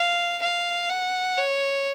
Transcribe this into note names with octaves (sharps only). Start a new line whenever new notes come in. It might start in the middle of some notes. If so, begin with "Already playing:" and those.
Already playing: F5
F5
F#5
C#5